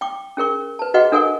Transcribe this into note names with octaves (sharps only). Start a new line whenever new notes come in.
G5 C#6 D6
C#4 G#4 A#4 C#6
B4 A5
F#4 G#4 B4 D#5 F#5 C#6
D4 A4 A#4 F#5 G#5 C#6